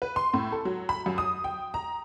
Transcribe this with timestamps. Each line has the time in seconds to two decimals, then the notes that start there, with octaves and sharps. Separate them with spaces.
0.02 B4
0.16 C6
0.34 A2
0.52 A4
0.65 F#3
0.89 B5
1.06 F#2
1.18 D#6
1.44 G5
1.74 A#5